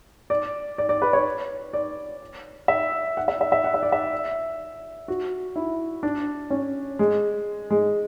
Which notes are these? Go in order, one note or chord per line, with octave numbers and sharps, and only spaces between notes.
D5
D5
D5
B4
C#5
D5
E5
F#5
E5
E5
E5
F#5
E5
D5
E5
F#4
E4
D4
C#4
G#3
G#3